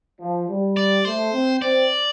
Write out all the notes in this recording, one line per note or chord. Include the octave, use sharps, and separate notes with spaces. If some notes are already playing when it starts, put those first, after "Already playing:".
F3
G3
D5
A3 C5
C4
C4 D5